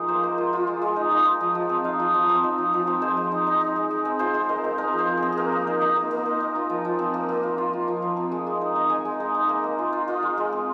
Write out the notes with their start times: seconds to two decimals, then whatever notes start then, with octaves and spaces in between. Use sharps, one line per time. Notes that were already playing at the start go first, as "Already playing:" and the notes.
Already playing: F3 G#3 D#4 A#4
0.08 A#3 C5
0.23 A#3
0.38 F4
0.53 F4
0.67 G#3
0.82 G#3
0.96 D#4
1.11 D#4
1.26 D#4
1.40 F3
1.55 F3
1.69 C4
1.84 D#4 F5
1.99 F3
2.14 F3
2.29 C4
2.44 D#4
2.58 F3
2.73 F3
2.87 C4
3.02 G#3 C5
3.17 G#3
3.32 D#4
3.47 D#4
3.61 D#4
3.76 G#3
3.90 G#3
4.05 C4
4.19 F4 C5
4.34 G#3
4.49 G#3 A#4
4.64 C4
4.78 D#4 A#4
4.93 F3
4.98 C5
5.08 F3
5.17 G#4
5.23 C4
5.32 G#4
5.37 A#3 A#4
5.52 A#3
5.67 D#4
5.81 D#4
5.96 A#3
6.11 A#3
6.26 D#4
6.40 D#4
6.56 F4
6.70 F3
6.85 F3
6.99 C4
7.14 A#3
7.29 A#3
7.43 F4
7.58 F4
7.73 F4
7.88 F3
8.02 F3
8.17 C4
8.32 G#3
8.47 G#3
8.61 D#4
8.76 D#4
8.90 G#3 G#5
9.05 G#3
9.20 D#4
9.35 D#4
9.49 A#3
9.64 A#3
9.79 F4
9.93 F4
10.08 F4 D#5
10.23 G#3
10.37 G#3
10.52 C4